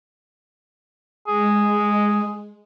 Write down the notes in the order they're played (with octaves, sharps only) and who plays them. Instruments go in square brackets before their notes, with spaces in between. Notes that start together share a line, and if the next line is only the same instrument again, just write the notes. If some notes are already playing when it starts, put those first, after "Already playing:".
[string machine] G#3 [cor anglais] G#4